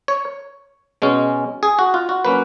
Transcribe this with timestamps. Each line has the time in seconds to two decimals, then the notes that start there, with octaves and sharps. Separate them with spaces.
0.08 C#5
1.02 B2 G#3 C#4
1.63 G#4
1.79 F#4
1.94 F4
2.09 F#4
2.25 F#3 A#3 C#4 B4